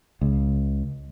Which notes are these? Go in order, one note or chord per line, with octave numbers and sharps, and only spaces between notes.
C#2